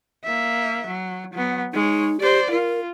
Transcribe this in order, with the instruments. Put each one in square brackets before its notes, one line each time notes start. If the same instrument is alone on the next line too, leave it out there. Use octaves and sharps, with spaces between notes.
[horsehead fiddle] A#3 E5
F#3
F#3 B3
[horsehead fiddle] G#3 C#5 [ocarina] D#4
[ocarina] G4 [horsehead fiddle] C5 D5
[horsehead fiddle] F4 [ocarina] A#4